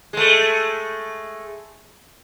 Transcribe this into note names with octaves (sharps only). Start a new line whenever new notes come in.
G#3 A3